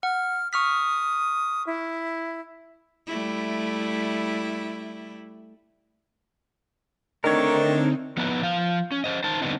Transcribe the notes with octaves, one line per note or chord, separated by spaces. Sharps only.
F#5 F6
C#6 D#6 F6 B6
E4
G3 A3 E4
D3 D#3 A3 C4 D4 D#4 A#4 C#5
F3 B3 D#4 E4 B4
F3 F4 F5
C#4
C#4 C5 D#5
D#4 C5 A5
D3 G3 B3 C4 D#4